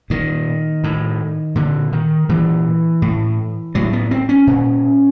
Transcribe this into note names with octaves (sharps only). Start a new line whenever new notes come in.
A#2 D#3
A2
A#2 D3
D#3
A#2 E3
A2
A2 F#3
B3
C4
C#4
A#2